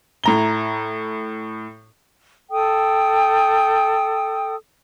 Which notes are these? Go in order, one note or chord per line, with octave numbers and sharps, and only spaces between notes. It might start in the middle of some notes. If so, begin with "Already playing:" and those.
A2 A#5 G7
A4 G5 D#6